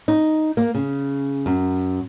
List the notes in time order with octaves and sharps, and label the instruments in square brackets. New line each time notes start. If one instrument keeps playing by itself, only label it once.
[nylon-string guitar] D#4
A#3
C#3
F#2